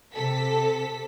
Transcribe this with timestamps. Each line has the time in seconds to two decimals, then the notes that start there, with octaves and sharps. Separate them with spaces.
0.13 C3 A4 B6